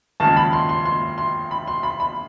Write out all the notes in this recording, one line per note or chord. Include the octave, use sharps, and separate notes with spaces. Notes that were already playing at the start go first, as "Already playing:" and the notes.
D#2 C#3 F3 G#3 C#4 A5
B5
C6
C6
C6
C6
B5
C6
B5
B5